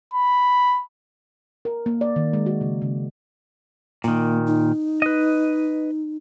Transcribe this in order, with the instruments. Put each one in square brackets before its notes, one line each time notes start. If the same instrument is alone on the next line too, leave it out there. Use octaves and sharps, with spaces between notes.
[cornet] B5
[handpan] A#4
A#3
D5
D#3
G#3
F#4
C#3
C#3
[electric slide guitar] A#2 D#3 [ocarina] A#3
[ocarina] D#4
[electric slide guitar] B4 D#5